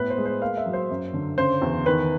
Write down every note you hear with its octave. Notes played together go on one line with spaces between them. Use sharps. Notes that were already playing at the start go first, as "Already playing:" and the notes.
Already playing: A2 B3 B4
C5
G#3
C5
A#3 F5
E5
F#3
C5
F#2
D3
C#3 C5
E2
D#3 B4